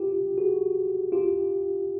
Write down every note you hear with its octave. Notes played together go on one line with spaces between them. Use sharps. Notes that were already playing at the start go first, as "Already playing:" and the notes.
Already playing: F4 G4
F#4 G#4
F4 G4